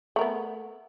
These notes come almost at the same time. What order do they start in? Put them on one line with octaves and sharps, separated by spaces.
A3 A#4 B3